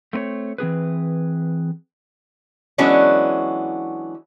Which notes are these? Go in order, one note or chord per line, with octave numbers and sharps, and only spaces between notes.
A3 C4 B4 C#5
E3 C4 G#4 B4
E3 F#3 G#3 B3 C#4 D4